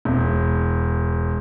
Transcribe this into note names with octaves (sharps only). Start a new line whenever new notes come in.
E1